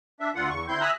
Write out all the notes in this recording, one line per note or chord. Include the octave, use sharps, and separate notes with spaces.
D4 E5
D2 D3 F4 F#5
E2 C#6
D3 C4 E4 C6 G6
E5 G#5 A#5 D#6 E6 F#6